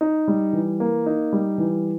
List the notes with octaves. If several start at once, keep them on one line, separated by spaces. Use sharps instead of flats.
D#4
G3
E3
A#3
D#4
G3
E3